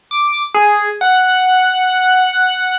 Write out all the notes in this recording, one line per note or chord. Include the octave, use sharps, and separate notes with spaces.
D6
G#4
F#5